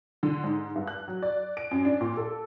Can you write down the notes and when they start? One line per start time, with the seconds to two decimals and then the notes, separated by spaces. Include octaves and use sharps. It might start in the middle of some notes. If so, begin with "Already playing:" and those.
0.23 D3
0.43 G#2
0.76 G2
0.87 F#6
1.08 F#3
1.22 D5
1.57 D7
1.71 F#2
1.85 D4
2.01 A#2
2.17 A4